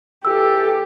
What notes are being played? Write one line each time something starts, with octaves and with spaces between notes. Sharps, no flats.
E2 E3 G4 A4 E6